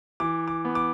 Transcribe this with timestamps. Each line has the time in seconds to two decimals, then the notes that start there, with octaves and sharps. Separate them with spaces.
0.20 E3 D6
0.48 D6
0.65 B3
0.75 D6